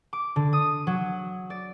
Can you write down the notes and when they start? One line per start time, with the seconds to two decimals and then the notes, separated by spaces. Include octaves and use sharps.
0.13 D6
0.36 D3
0.53 D#6
0.87 F#3
1.50 D5